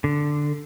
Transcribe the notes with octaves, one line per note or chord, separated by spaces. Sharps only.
D3